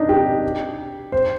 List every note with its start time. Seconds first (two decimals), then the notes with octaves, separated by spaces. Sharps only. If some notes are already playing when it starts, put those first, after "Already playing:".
Already playing: D4 D#4
0.09 G4
1.12 C5